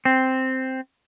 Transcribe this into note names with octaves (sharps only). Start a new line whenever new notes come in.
C4